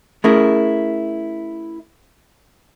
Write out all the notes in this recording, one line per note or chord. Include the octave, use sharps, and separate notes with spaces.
A3 C#4 E4 G#4 A#4